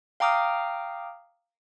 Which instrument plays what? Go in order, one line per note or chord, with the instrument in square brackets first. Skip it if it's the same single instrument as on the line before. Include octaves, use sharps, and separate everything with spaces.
[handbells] F5 G5 A#5 D6 D#6 F6